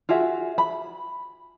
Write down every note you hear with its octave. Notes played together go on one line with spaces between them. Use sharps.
F4 F#4 G#4 E5
B5